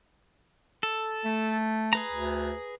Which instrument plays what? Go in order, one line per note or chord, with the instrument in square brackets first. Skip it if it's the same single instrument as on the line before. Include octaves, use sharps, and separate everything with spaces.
[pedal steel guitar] A4
[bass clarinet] A3
[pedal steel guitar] G#4 B4 A#5
[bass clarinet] D2